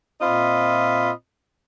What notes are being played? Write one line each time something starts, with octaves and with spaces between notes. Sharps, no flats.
A#2 C4 F4 D#5 E5 B5